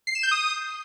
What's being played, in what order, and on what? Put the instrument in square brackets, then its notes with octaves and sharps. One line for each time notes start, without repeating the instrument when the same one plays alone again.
[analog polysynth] C7
E7
G6
D#6